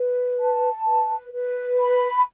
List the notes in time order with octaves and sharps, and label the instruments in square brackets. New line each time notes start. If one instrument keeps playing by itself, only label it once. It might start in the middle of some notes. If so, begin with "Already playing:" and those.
Already playing: [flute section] B4
A5
B4
B4
B5